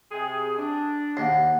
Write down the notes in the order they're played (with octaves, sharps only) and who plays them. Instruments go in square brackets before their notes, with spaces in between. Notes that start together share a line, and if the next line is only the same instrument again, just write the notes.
[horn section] C3 G#4 G5
D4
[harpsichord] D#2 [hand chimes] F#5 C7